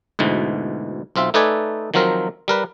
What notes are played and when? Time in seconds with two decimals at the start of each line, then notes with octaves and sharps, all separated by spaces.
0.19 D2 G#2 B2 E3
1.16 B1 C4 F4 E5
1.34 A3 D#4 A4 B4 D5 G#5
1.94 D#3 F3 F#3 C4 A#4
2.48 G3 A#4 B4